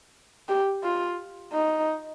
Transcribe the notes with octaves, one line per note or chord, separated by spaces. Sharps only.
G4
F4
D#4